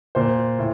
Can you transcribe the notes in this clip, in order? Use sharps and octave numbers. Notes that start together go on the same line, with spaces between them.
A#2 C5
A2